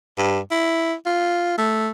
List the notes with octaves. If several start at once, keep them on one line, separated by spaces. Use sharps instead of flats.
G2
E4
F4
A3